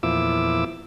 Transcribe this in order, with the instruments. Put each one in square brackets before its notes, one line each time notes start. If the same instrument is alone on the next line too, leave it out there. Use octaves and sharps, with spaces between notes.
[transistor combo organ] E2 A#2 F3 E4 D6 E6